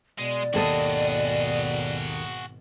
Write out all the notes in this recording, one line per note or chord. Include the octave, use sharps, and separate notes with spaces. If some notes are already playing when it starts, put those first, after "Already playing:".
B2 G#3 D5
G#1 D#2 B2 F#4 G#4 A4 D#5